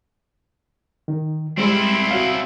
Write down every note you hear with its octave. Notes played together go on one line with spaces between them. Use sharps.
D#3
G3 G#3 C4 E4
F#4 C#5 F5